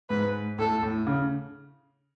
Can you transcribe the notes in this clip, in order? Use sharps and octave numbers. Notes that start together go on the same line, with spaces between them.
G#2 B4
A2 A4
A2
C#3